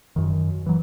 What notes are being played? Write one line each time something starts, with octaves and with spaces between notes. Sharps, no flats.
F#2 D#3
E3 F#3